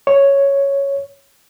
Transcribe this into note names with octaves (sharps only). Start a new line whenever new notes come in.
C#5